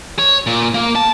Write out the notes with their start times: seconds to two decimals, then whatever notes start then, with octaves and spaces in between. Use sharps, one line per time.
0.19 C#5
0.47 A#2
0.74 A#3
0.95 A5